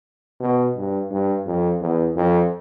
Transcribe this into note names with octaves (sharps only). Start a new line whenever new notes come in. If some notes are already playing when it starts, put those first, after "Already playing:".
B2
G2
G2
F2
E2
F2